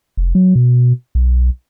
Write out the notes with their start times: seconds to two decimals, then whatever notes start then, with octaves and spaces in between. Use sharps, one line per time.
0.17 F1
0.35 F#3
0.55 B2
1.15 B1